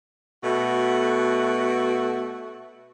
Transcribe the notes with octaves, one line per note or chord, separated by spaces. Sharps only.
B2 A3 F#4